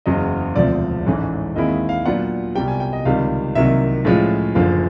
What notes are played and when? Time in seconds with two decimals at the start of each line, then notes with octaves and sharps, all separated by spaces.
0.06 F#1 E2 C#3 F#3 D#5
0.56 E1 D2 C3 F3 D5
1.06 A1 G#2 E3 A3 C#4
1.56 D#2 D#3 G#3 C4 E4 D#5
1.89 F5
2.05 A#2 F#3 B3 D4 F4 F#5
2.55 C2 B2 G3 G5
2.68 G#5
2.80 G5
2.93 D#5
3.05 C#2 C3 D#3 G3 F5
3.55 C2 C3 D#3 F#3 A#3 E5
4.05 A2 F3 G#3 C#4 F4
4.55 F#1 F#2 D3 F3 F5